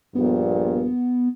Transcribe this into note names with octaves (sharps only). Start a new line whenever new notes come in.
A#1 G2 A#2 B3